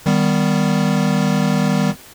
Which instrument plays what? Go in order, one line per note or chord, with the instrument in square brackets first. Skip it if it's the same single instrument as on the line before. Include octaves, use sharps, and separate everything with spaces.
[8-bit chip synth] D#3 G3 B3